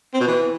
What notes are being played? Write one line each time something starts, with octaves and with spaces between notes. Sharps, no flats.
C4
B2
E3